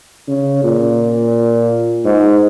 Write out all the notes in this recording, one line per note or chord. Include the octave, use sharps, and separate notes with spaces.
C#3
A#2
G#2